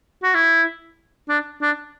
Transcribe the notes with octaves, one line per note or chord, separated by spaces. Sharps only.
F#4
E4
D4
D4